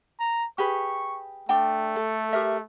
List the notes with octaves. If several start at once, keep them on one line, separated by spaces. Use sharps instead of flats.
A#5
G4 G#4 B4 C#6
A3 D4 G5 A5
A4
G4 A#4 E5